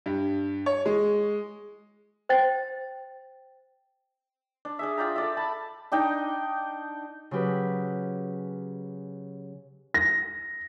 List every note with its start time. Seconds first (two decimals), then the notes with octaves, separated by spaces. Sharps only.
0.06 G2
0.66 C#5
0.86 G#3
2.29 C5 G5 A6
4.65 D4
4.79 D4 G#4 E5
4.98 F4 D5 G5 A#5
5.16 A4 D5 E5
5.37 A5 B5
5.92 D4 D#4 G5
7.31 C#3 F#3 G4 B4
9.94 A#6